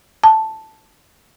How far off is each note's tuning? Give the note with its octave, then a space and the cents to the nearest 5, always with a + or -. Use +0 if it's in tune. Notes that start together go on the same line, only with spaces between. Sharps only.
A5 +0